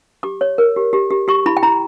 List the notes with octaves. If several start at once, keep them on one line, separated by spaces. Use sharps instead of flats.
G4 D6
C#5
A#4
G4
G4
G4
G4 C#6
E4 B5
G5
E4 A#5